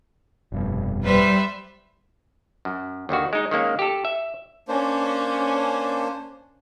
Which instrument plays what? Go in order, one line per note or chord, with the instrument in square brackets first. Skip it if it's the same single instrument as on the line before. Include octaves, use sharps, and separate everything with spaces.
[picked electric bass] F1 G2 B2
[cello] G3 [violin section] B4 C5 E5
[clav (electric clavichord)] F#2
D#2 D3 D#3 F#4
G#3 D#4
D#3 G#3 A#3 C#4
G4 A4
E5
[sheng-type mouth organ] A#3 D4 C5 [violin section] C#4